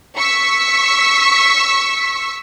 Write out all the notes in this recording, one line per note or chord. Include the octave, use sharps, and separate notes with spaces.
C#6 E6 B6